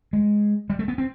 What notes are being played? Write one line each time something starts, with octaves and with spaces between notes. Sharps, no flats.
G#3
G3
A3
B3
C4